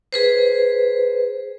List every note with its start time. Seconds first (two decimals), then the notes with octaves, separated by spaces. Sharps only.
0.13 G#4 B4 C5